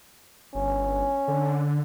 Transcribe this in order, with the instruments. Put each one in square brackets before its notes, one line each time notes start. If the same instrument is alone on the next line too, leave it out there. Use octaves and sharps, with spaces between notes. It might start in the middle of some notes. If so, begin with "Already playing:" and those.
[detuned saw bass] G1 [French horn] C#4
[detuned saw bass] D3